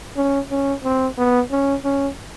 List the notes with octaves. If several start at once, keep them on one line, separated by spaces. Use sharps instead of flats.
C#4
C#4
C4
B3
C#4
C#4